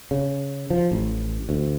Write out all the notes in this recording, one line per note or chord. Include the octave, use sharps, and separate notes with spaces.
C#3
F3
A1
D2